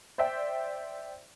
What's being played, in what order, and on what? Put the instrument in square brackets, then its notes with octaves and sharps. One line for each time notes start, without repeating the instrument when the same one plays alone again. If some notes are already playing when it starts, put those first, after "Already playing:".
[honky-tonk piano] C5 D5 E5 G5